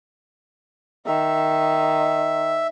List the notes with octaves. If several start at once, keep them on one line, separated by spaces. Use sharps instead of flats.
D#3 E5